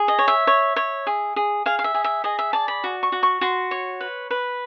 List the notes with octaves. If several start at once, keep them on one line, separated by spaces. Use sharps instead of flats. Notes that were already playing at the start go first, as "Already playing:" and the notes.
Already playing: G#4
D#5
C#5
E5
C#5
C#5
G#4
G#4
G#4 F5
F5
E5
G#4
E5
G#4 D#5
E5
D5 A5
B5
F#4
C#6
F#4
C#6
F#4 C6
C#5
B4
B4